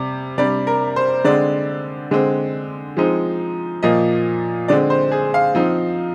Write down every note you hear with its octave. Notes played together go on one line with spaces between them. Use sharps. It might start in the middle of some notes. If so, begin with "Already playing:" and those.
Already playing: C3 G3
C3 G3 D4 D5
A#4
C5
D3 G#3 C4 D5
D3 G#3 C4
F3 G#3 C4 D#4
A#2 F3 A#3 D#5
D3 G#3 C4 D5
C5
G#4
F5
F3 C4 D#4